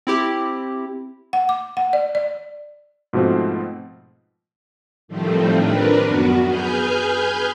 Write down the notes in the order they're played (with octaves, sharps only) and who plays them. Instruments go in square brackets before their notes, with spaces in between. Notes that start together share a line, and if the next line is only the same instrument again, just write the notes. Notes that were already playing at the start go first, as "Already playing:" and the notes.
[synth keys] C4 E4 G4
[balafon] F#5
D6
F#5
D5
D5
[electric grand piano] G#2 B2 F3 A3 C4
[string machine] A2 D#3 F3 G3 A3 C4
D4 A#4 B4
F#2 B3 F#4
G#4 B4 G#5 F6 G6